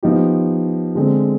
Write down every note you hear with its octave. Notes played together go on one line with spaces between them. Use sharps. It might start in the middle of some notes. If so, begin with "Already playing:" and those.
F3 B3 D#4 G4
D3 G#3 C4